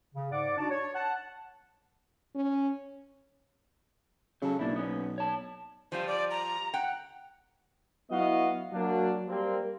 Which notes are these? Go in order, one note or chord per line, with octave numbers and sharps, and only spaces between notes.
C#3
G#2 D5 F#5 D6
D4 D#4 F#4 D5 A5
C#5
F#5 A5
C#4
C#3 F#3 A4
B1 A#3 D4 E4
B3 C#4
C#5 A5
F3 G3 F4 C5
D5
A#5
F#5 G5
F#3 B3 E4 F#4 D#5 F5
F#3 A#3 D4
G3 A#3 C4